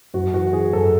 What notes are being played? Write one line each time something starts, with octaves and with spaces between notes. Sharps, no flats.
F#2 F#4
E3 F#4
E3 G#4
F#2 A4